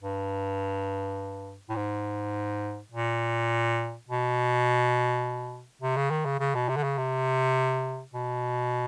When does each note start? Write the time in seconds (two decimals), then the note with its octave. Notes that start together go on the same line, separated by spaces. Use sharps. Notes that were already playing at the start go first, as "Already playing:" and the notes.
0.02 G2
1.69 A2
1.76 G#2
2.92 A#2
4.09 B2
5.82 C3
5.96 C#3
6.11 D#3
6.26 C#3
6.40 C#3
6.55 B2
6.69 C3
6.76 D3
6.84 C#3
6.98 C3
8.14 B2